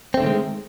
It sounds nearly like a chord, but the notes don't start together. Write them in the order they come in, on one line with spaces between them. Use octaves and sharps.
C4 A3 D3 D#3 G#3